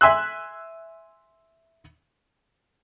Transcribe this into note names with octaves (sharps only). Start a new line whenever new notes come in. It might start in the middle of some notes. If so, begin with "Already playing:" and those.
E5 G#5 C6 E6 F#6